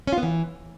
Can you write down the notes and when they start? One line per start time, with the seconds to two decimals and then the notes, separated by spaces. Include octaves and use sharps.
0.07 C#4
0.13 F4
0.18 B3
0.23 E3